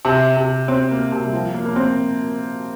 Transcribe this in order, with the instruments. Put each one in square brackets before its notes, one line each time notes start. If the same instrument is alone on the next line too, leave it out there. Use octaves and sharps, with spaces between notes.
[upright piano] C3
C3
C4
A#3
C3
G3
F3
A#3
A#3
C4